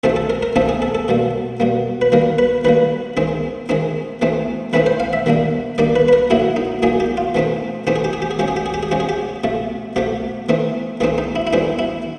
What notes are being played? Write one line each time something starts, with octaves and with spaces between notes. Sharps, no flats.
C3 F3 A3 C4 D#4 A4
A4
A#4
A#4
C3 F3 A3 C4 D#4 A4
G#4
A4
A4
B2 G3 A#3
B2 G3 A#3
B4
D#3 G3 A#3 A#4
B4
D#3 G3 A#3 B4
D#3 G#3 C4 D#4
D#3 G#3 C4 D#4
E3 A3 C4 D#4
E3 A3 C4 D#4 B4
C5
F5
E5
D#3 G3 A#3 D4
D#3 G3 A#3 D4 D5
B4
B4
A#4
A2 F#3 A#3 D#4 E4
D#4
A2 F#3 A#3 D#4 G#4
G4
F4
E3 A3 C4 D#4
E3 A3 C4 D#4 G4
G#4
G4
G#4
G4
G#4
F3 G#3 C#4 G4
G#4
G4
G#4
G4
G#4
F3 G#3 C#4 G4
G#4
G4
C3 F3 A3
C3 F3 A3 G4
E3 A3 C4 D#4
E3 A3 C4 D#4 G#4
D#4
E4
E4
A2 E3 G3 C4 D#4
E4